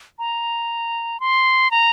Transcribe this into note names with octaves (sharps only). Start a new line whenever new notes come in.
A#5
C6
A#5